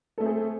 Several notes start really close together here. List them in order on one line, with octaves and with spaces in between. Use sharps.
A4 A3 C4 G#4